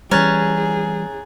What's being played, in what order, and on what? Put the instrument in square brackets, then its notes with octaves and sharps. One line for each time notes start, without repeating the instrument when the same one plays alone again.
[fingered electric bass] E3 G3 [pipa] C#4 [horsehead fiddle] G#4 [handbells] A#5 F#6 A6